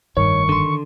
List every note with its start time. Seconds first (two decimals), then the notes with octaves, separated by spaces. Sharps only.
0.17 F1 G2 D#3 C#5 C#6
0.49 D3 C6